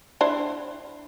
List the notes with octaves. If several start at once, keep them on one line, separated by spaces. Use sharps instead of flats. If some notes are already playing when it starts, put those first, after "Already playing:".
D4 E4 C5